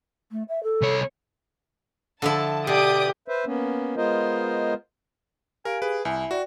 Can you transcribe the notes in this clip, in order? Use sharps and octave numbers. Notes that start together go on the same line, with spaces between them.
A3
E5
A4
C2 C#5
D3 F3 E4 A5
B2 G4 D5 D#6 D7
B4 C5 E5
A#3 B3 C#4
G#3 B3 F4 A#4 C5 D#5
G4 A#4 F5 G#5 D7
G#4 B4
C2 E4 G#5
F#4 D5 G5